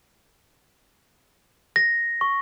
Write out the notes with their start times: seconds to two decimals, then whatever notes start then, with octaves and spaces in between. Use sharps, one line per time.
1.76 A#6
2.21 C#6